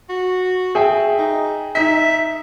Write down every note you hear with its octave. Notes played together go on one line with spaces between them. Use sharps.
F#4
G#4 E5 G5
D#4
D#4 E5 B6